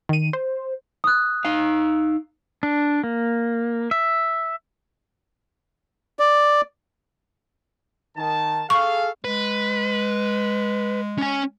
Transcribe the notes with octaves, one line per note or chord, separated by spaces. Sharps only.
D#3 D#7
C5
D#6 F#6
D#4 F5
D4
A#3
E5
D5
D#3 A5
G#4 A4 F5 C#6
G#3 B4
C#4 G#5